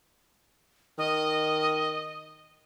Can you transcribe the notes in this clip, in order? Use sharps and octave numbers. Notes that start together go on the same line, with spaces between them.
D#3 D#5